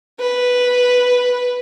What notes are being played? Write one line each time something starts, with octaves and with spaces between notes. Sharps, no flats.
B4